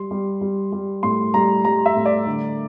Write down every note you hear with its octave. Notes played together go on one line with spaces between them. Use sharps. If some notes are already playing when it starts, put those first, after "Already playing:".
Already playing: G3 C6
G3
G3
G3
A2 C6
G3 A#5
G3 A#5
E5
A2
D5
D3